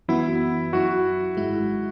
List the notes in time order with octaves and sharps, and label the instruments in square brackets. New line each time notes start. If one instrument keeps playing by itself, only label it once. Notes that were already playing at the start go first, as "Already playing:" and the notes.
[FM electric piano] F#2 E3 B3 F#4 [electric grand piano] E4
[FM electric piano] F#2 F#3 E4 [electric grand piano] F#4
[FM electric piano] G#1 G#2 G#3 E4